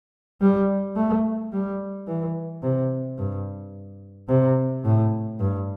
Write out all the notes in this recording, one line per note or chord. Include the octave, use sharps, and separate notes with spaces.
G3
A3
G3
E3
C3
G2
C3
A2
G2